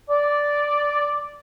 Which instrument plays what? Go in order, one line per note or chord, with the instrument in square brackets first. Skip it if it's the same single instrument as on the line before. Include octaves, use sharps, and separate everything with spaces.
[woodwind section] D5